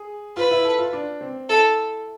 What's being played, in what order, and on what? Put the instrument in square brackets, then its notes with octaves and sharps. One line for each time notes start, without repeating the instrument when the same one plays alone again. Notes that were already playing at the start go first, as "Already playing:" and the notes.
Already playing: [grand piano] G#4
[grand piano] F4 [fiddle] B4
[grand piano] E4
A4
F4
D4
C4
[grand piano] E4 [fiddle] A4